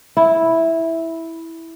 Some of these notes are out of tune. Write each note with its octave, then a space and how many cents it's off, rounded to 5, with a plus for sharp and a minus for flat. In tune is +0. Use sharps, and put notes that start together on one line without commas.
E4 -5